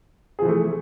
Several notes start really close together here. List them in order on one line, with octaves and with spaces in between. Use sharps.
G#4 F3 E3 A3